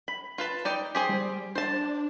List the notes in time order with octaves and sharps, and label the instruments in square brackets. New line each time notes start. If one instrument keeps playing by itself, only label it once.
[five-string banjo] B5
F4 B4 A5
D#4 D5 G5
G4 G#4 C5
[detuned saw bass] G3
[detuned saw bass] D4 [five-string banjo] C5 A5